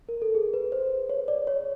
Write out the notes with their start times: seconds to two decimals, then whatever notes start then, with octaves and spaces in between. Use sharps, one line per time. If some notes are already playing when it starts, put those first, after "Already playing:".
0.09 A#4
0.22 A4
0.35 G#4
0.54 B4
0.72 C5
1.09 C#5
1.28 D5
1.47 C#5